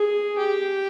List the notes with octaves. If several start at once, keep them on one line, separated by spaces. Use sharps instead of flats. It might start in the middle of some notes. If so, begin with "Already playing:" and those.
Already playing: G#4
G4